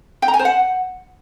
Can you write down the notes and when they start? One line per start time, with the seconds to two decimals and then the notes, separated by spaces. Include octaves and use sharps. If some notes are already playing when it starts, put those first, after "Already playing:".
0.22 G5
0.28 A#5
0.34 G#5
0.39 C5
0.45 F#5